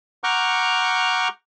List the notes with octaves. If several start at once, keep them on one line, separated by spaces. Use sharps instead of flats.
F#5 A#5 C#6 D6 F6 G6